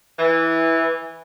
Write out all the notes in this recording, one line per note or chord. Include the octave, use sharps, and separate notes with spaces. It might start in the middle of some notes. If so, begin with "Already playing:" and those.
E3